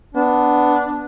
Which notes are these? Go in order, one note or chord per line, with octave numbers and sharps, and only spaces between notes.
B3 D4